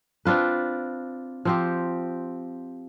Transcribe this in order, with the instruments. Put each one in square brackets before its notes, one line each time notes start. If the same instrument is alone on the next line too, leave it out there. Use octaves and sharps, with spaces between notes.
[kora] C4 D4 F4 B4
F3 C4 G4